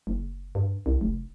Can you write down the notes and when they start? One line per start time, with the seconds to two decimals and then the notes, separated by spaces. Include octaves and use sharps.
0.07 F#1
0.55 G2
0.86 C2
1.01 F1